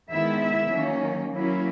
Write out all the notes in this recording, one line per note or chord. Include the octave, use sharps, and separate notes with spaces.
D#3 G#3 B3 E4 E5
E5
D#3 F#3 A#3 C#4
F#3 A#3 C#4 E4